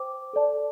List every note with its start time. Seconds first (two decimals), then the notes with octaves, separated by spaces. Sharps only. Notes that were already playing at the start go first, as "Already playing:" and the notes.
Already playing: C5 G5 D6
0.33 A4 D5 A5